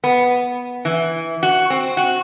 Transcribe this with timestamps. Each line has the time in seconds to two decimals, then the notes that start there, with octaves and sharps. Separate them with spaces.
0.04 B3
0.85 E3
1.43 F#4
1.70 C4
1.97 F#4